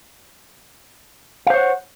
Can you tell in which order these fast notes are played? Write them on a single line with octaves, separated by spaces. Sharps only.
F5 C5 C#5 F#5